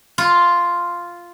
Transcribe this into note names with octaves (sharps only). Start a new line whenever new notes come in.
F4